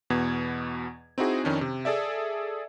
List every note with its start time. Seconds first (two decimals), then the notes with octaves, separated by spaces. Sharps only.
0.10 E2 B2 B3 G#6
1.18 C4 D#4 E4 F#4 G#4
1.44 F2 D#3 C#4 D4
1.61 C3
1.85 G#4 A4 D5 E5